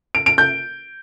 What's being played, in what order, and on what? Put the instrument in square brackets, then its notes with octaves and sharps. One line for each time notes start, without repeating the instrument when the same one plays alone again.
[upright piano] D7
D7
G6